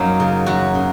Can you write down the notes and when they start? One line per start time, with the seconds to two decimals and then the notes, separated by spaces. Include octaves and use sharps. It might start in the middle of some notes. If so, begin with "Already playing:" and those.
Already playing: F#2 F#3 A#3 C#4 D#4
0.20 C#3
0.46 F#2 F#4
0.75 C#3